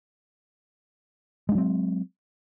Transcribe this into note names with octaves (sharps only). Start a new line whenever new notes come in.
F#3 G#3 C4 D4